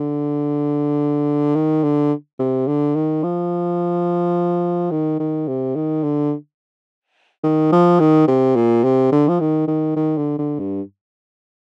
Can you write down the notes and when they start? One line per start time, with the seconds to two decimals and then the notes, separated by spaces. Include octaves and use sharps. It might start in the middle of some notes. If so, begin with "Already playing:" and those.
Already playing: D3
1.55 D#3
1.83 D3
2.39 C3
2.67 D3
2.95 D#3
3.23 F3
4.91 D#3
5.20 D#3
5.48 C3
5.76 D#3
6.03 D3
7.44 D#3
7.72 F3
8.00 D#3
8.28 C3
8.56 A#2
8.84 C3
9.12 D3
9.28 F3
9.40 D#3
9.68 D#3
9.96 D#3
10.17 D3
10.38 D3
10.59 G2